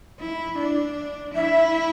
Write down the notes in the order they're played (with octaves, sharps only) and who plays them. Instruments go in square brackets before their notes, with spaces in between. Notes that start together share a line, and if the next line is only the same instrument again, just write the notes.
[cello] E4
D4
[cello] E4 [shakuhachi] E5